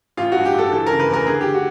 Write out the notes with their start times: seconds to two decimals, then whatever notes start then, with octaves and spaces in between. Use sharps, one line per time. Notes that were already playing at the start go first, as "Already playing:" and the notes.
0.17 A1 F4
0.32 G2 F#4
0.45 G4
0.54 G2 A4
0.72 E3 A4
0.86 C#3 A#4
1.00 B4
1.09 E2 A#4
1.27 D3 G#4
1.41 D3 G4
1.54 F#4